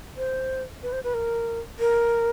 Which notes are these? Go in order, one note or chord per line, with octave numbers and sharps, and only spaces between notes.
C5
B4
C5
B4
A#4
A#4